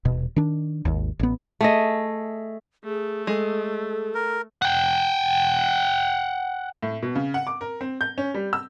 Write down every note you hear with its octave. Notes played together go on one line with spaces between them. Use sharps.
D#1 B2
D#3 D4
G#1 D#2
A1 B3
A3 G#4 D#5
A3 G#4
G#3 A4
A#4
F#5 G5
A2
B2
C#3
F#5
D6
A#4
C4
G6
C#4
G3
E6